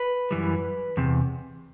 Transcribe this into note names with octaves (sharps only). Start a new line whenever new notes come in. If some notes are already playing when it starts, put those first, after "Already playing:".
Already playing: B4
F#2 E3 G3
E2 C3